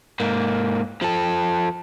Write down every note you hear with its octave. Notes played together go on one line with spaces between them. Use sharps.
G#2 A#3
F3 A4